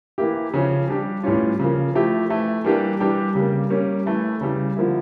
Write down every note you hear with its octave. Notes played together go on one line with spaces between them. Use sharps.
E3 A#3 E4 G4
C#3 F3 C#4
G3 D4 G4
A2 E3 G3 C#4 F4
C#3 F3 A#3
F3 A3 E4 G4
E3 A3 E4
E3 G3 A#3 D4 G4
E3 G3 D4 G4
C#3 G3 A#3
G3 A#3 C#4
E3 A3 E4
C#3 E3 G3
D3 F3 A#3 E4